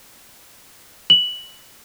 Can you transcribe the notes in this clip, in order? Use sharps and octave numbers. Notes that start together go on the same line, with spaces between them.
F#7